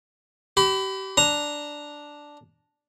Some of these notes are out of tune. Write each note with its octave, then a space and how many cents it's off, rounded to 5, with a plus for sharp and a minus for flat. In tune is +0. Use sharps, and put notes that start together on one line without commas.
G4 -35 B5 +25
D4 +0 A#5 +0